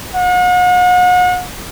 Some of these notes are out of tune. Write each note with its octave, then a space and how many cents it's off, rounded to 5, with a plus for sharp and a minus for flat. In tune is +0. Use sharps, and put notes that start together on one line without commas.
F#5 -40